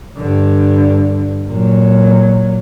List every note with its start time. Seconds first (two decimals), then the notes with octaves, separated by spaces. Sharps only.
0.18 G2 D3
1.48 A#2 F#3